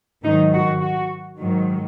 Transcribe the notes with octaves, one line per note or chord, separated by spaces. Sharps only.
G#2 D#3 F#3 D#4
F#4
F#4
G#2 D#3 F#3